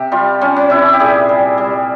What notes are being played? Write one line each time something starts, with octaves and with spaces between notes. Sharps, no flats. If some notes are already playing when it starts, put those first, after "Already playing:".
Already playing: C3 G4
G3 F4
G3 C#4
C#4
C3 E4
G4
A#2 G#4
G3
G3